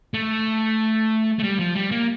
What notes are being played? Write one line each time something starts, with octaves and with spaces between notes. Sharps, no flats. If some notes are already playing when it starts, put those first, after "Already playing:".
A3
A3
G3
F3
G3
A#3